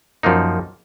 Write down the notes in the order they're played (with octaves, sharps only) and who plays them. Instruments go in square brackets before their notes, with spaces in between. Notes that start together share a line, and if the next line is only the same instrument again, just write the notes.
[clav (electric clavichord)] F#2 F3 A#3 D#4